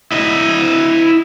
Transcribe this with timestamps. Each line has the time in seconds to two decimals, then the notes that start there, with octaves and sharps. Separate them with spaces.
0.12 E4 D#5